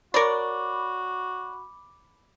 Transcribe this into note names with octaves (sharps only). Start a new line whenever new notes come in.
F#4 A#4 C#5 D5 B5 D6